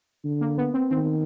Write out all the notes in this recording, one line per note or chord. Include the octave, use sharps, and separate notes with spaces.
D3
A#3
B3
C4
D#3 C4